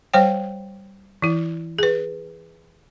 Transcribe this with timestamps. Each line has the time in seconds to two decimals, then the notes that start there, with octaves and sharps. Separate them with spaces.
0.14 G3 C5 C#5 G5
1.22 E3 E4
1.79 G#4 B4